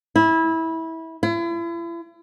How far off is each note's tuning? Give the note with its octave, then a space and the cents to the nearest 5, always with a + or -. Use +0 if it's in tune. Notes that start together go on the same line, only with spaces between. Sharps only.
E4 -20
E4 +40